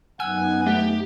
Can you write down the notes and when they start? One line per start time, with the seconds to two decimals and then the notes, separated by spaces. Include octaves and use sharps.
0.20 F#2 B3 D#4 F#5 G#5 E6
0.67 A3 G4